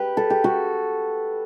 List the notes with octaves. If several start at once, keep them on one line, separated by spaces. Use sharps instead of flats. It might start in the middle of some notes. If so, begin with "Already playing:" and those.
Already playing: G4 B4
A4
G4
F#4 A4